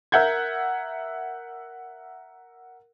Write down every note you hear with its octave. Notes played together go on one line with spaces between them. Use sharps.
A#4 E5 F#5 G6 G#6